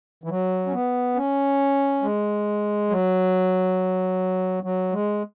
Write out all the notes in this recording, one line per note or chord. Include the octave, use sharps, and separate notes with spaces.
E3
F#3
C#4
B3
C#4
G#3
F#3
F#3
G#3